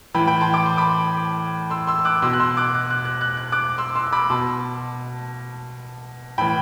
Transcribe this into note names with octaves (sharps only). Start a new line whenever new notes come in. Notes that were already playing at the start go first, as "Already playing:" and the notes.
A2 E3 G5 B5
G5 B5
A5 C6
D6
C6
B5 D6
C6 E6
C6 E6
D6 F#6
B2 C6 E6
F#6
C6 E6
D6 F#6
F#6
F#6
F#6
F#6
F#6
D6 F#6
C6 E6
C6 E6
B5 D6
B2 A5 C6
A2 E3 G5 B5